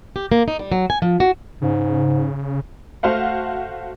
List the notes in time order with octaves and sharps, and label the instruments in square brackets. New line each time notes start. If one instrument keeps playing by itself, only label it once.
[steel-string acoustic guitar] G4
A#3
D#4
G3
F#3
G#5
F3
F#4
[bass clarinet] G#2 [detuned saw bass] C#3
[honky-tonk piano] A3 F#4 C5 F5 F#5